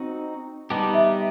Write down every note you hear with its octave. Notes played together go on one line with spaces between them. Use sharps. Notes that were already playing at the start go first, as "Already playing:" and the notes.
Already playing: C4 D#4 F#4
G3 B3 D#4 G4 A5
E5